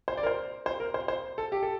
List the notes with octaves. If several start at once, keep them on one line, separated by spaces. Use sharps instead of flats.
C5
D5
A#4
C5
C5
A#4
C5
C5
A4
G4
A4